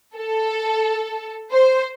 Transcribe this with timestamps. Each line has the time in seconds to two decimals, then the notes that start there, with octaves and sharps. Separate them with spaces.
0.16 A4
1.51 C5